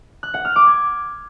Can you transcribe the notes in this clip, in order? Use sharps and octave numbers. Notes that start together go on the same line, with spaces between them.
F#6
F#5
F6
D6
G#6